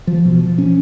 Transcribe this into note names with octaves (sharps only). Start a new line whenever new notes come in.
F3
B2
F3
C#4